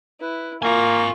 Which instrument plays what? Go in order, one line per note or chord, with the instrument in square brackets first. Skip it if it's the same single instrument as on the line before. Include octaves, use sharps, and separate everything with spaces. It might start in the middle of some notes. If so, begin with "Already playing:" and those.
[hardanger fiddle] E4 [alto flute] B4
[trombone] A#3 [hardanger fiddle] F4 [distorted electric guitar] A#4 G#5 [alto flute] C#6